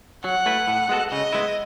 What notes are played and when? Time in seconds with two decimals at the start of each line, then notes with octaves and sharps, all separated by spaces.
0.24 F#3 F#5
0.46 A3 E4 B4
0.68 A2
0.89 G#3 B3 F#4 A4
1.11 C#3 D#5
1.33 G#3 B3 E4